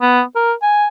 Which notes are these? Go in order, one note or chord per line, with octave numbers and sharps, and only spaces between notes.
B3
A#4
G#5